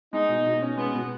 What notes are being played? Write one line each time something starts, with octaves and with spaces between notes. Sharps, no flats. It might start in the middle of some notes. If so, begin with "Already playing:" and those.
G#3 D#4
B2
B2
C#4
G#3 B3
B2